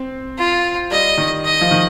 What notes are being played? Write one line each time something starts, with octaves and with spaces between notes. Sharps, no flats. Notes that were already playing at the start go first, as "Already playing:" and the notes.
Already playing: C4
F4
G3 D#5
D#3
D#5
F3
D#3